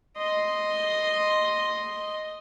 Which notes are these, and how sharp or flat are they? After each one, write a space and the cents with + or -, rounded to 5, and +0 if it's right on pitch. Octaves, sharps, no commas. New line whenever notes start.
D#5 +0 C6 +0